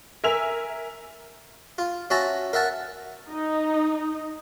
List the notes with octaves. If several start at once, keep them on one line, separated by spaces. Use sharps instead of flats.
A#4 E5 G#5 E6 F7
F4
C#4 F#4 E5 A5 A#5
A#4 E5 F#5 A5
D#4